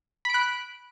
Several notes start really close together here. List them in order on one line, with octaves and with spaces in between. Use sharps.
B5 D7 F#6